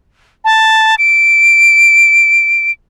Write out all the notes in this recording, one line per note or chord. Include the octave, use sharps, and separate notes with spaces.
A5
D7